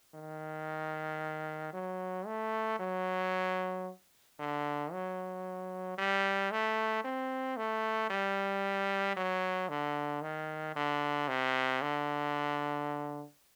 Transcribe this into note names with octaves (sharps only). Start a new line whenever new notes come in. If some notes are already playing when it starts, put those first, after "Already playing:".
D#3
F#3
A3
F#3
D3
F#3
G3
A3
C4
A3
G3
F#3
D3
D#3
D3
C3
D3